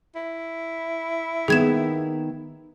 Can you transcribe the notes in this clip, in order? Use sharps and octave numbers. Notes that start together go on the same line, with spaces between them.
E4
D#3 A#3 B3 G#4 G#6 E7